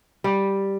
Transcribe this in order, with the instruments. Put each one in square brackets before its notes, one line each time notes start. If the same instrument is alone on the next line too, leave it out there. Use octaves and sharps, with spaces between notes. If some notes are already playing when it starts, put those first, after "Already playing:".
[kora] G3